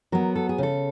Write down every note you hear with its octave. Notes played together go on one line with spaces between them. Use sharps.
F#3 B3 A#4
A4
G#4
C#3 A4